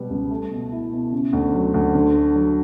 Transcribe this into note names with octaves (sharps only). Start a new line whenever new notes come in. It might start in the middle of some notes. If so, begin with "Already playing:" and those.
Already playing: B2 G3 B3
C#2
A3
B2
E4
B2
C#3
D2
F#3
D2
D3
A3
F#3